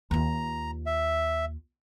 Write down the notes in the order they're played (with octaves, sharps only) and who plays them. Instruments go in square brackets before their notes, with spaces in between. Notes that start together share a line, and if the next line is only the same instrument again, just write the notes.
[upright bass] D#2 F4 [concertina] A#5
[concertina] E5